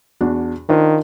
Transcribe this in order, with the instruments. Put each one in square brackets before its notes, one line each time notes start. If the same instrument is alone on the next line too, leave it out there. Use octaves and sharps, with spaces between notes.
[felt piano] E2 D4 F#4
[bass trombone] D#3 [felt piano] D4 F4 C5